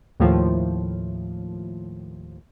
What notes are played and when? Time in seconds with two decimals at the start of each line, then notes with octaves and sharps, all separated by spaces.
0.20 D#2 A2 F3